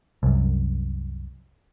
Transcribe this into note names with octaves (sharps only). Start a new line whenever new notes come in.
C2 F#2